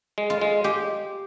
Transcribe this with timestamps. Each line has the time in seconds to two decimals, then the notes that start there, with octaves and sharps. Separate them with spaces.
0.18 G#3
0.30 F4
0.41 G#3
0.64 G#3 G4